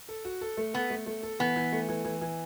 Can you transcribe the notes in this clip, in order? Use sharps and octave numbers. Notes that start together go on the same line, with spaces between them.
A4
F#4
A4
A3
B3 A4
A3
A3
A4
E3 B3
E3
A3
E3
E3
E3